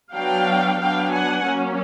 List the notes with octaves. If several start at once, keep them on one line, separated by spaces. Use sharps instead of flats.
F#3 B3 D4 F5 G5
F#3 B3 D4 F5 G5
F#5 G#5
F#3 A#3 C#4